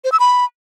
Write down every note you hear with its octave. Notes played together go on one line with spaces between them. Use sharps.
C5
E6
B5